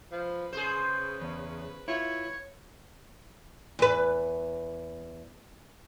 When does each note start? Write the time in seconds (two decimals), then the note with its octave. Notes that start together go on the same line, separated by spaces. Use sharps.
0.12 F3 B4
0.53 C#3 G#4 C5
1.21 E2
1.88 E4 F4 C#5
3.79 E2 B4